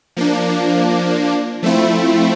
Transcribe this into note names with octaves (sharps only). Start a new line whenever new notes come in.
F3 A#3 D4
F3 A3 C4 E4